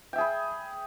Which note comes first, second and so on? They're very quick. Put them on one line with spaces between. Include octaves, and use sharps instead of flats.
G5 E5 G#4 B5